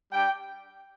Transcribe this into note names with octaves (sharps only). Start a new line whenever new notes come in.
G3 D4 G4 G5